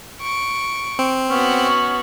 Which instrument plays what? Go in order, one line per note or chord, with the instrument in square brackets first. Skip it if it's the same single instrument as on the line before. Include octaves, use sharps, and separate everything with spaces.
[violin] C#6 D7
[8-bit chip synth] C4
[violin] B3 F#4 [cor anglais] C#4